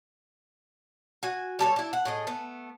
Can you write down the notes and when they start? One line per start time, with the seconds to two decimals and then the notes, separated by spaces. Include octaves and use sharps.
1.23 F#4 G#5
1.59 G3 A4 B4 C#5
1.76 D4 E4
1.93 F#5
2.05 A2 G#4 D#5
2.27 A3 B3